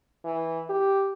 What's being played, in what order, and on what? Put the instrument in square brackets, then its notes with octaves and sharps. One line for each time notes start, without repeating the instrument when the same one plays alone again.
[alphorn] E3
G4